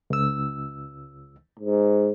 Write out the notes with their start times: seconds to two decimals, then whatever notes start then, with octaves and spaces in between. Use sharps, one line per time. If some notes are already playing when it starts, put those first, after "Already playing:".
0.10 C#2 E6
1.59 G#2